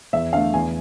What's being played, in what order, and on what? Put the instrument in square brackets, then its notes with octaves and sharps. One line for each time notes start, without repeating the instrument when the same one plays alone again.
[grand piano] E2 E5
D3 A3 F5
E2 G#5